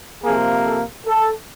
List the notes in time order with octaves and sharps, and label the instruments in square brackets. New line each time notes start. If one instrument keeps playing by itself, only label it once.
[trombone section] C3 F3 A#3 G#4
A4
A4